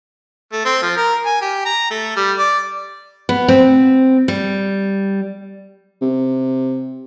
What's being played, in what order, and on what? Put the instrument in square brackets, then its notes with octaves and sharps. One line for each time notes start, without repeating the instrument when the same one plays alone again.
[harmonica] A3
C4
F3
A#4
G#5
G4
A#5
A3
G3
D5
[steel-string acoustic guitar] B3
C4
G3
[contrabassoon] C3